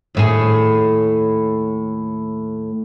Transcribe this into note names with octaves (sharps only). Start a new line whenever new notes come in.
D#2 A2 G#4